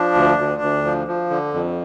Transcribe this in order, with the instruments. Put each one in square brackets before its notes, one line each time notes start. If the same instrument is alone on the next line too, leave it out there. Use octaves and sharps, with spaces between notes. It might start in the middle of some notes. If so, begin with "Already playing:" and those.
Already playing: [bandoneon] F3 D4
D2
D2
D2
F3
F3
D3
F2